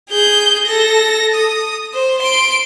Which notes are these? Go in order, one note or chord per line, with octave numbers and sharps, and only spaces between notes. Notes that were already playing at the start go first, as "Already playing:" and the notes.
G#4 G6
A4 A#6
D#6
C5
C6 D7